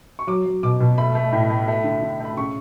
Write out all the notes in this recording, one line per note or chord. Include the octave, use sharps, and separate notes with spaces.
C#6
F#3 D6
F#3
B2 D6
B2
A3 B5
A3
A2
A3
A3
D3
D3
A3 B5
C#3 C#6